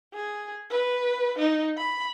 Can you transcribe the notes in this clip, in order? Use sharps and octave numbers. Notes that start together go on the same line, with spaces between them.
G#4
B4
D#4
B5